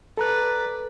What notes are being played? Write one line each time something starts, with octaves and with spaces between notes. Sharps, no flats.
A4 B4 D5 A#5 F#6